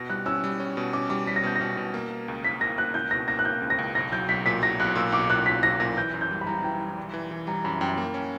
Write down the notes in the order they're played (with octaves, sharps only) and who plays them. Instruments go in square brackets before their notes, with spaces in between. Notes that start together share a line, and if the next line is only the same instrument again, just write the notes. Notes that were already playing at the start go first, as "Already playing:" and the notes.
Already playing: [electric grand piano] B2 [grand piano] A#6
[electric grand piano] G3 [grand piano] F#6
[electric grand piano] C#4 [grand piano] E6
[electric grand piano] G3
C#4
B2
[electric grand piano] C#4 [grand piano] D6
[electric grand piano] G3 [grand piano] D6
[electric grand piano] G3 [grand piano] B6
[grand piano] A#6
[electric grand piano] B2 [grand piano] G6
[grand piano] A#6
[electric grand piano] B2
B2
A#3
A#3
C#2
[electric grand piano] A#3 [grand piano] B6
[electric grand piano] A#3 [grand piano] A#6
[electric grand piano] A#3 [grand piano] F#6
[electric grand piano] C#2 [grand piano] G6
[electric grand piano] B2 [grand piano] A#6
[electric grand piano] A#3 [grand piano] A#6
[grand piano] F#6
[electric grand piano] A#3 [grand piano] G6
[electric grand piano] C#2
[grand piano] A#6
[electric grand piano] C#2
[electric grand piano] B1 [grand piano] A#6
[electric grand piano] F#3 [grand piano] G6
[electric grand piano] B1 [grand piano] B6
[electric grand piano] A#2 [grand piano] B6
[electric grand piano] F#3 [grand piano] A#6
[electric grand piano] B1 [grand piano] F#6
[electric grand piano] A#2 [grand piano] E6
[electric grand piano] B1 [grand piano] D6
[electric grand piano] A#2 [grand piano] F#6
[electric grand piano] A#2 [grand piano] B6
[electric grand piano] F#3 [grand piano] A#6
[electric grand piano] A#2 [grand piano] A#6
[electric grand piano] E3 [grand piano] G6
[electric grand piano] F#2
[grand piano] G6
[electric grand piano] G3
[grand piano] B5
[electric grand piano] G3 [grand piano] A#5
[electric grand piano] E3 [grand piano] G5
[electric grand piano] G3
G3
E3
E3
[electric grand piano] G3 [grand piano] A#5
[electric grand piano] F#2 [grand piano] B5
[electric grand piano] F#2 [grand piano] G5
[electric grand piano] A#3
C#4